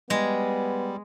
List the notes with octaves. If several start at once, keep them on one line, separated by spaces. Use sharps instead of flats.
G3 G#3 B3